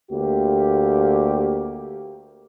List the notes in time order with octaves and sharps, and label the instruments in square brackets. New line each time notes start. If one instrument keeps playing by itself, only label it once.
[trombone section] D2 A#3 G4